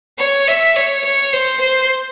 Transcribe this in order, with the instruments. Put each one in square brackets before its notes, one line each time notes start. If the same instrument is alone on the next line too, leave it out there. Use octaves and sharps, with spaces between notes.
[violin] C#5
E5
C#5
C#5
C5
C5